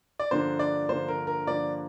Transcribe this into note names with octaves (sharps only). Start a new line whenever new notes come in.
D5
G2 D3 F3 A#3 C5
D5
G2 D3 F3 A#3 C5
A#4
A#4
G2 D3 F3 A#3 D5